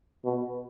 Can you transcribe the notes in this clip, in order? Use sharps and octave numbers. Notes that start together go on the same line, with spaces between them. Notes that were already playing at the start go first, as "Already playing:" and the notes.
B2